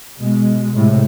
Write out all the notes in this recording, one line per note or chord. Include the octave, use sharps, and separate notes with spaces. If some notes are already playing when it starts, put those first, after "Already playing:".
B2 G#3
A2 C3 G#3